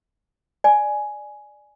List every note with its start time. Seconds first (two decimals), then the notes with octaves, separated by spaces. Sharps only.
0.64 D5 G#5